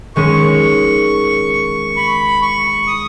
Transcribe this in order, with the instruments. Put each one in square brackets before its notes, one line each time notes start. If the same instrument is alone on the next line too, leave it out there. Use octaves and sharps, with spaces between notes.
[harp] D#3 G#3 C#4 [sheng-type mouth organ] C#6
[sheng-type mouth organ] B5
C#6
D#6